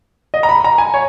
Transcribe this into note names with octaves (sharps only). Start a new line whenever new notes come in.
D#5
A#5
B5
A#5
G#5
C#5